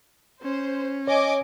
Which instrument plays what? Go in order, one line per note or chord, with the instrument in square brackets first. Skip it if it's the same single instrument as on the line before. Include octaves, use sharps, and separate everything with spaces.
[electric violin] C#4 [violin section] C5
[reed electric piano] C#5 [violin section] D#5 G#5 D6